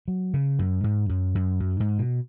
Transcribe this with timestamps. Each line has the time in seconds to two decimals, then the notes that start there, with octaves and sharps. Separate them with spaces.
0.08 F#3
0.34 C#3
0.59 F#2
0.84 G#2
1.09 F#2
1.35 F#2
1.60 F#2
1.80 G#2
1.99 B2